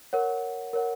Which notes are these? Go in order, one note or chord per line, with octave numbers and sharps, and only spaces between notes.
A#4 C#5 F#5
A#4 C#5 F#5